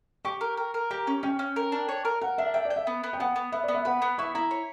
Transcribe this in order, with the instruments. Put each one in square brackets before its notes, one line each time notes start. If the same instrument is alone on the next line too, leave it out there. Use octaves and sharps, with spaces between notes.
[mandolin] G4 [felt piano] C#6
[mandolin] A#4
A#4
A#4
[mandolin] G4 [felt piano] A#5
[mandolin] C#4
[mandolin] C#4 [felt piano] G5
[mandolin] C#4
A#4
D4
C#5
A#4
[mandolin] A#4 [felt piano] F#5
[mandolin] D4 [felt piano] E5
[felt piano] E5 [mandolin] G5
[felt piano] D5
[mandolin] G5
[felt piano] E5
[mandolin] B3
B3
[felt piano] G5
[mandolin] B3 [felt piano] F#5
[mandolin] B3
[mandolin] B3 [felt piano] E5
[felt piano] D5
[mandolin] B3
[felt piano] E5
[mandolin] B4 [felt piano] F#5
[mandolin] B3
[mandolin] E4 [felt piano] C#6
[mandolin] E4 [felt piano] A#5
[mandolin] C#5